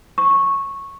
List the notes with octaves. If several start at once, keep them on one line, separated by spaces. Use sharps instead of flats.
C#6